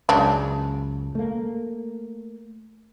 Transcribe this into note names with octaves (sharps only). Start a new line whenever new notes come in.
C#2 F#2 C#3 D4
A3 A#3